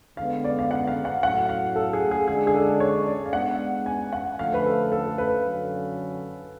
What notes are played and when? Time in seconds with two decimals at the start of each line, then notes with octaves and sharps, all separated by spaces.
0.17 D3 G#3 B3 F5
0.44 D5
0.59 F5
0.71 F#5
0.87 F5
1.05 F#5
1.23 A2 F#3 A3 F#5
1.49 F5
1.76 A4
1.93 G#4
2.11 G#4
2.28 D3 G#3 D4 G#4
2.47 G#4
2.55 A4
2.80 C#5
3.07 D5
3.26 F5
3.33 G#3 B3 D4 F#5
3.86 G#5
4.13 F#5
4.39 D3 F3 A3 F5
4.54 B4
4.66 A4
4.92 A4
5.18 B4
5.44 D3 F#3 C#4